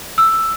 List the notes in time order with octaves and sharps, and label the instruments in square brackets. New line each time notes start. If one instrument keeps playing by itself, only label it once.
[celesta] E6